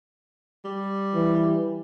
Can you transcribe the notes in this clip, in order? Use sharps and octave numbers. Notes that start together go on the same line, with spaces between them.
G3
E3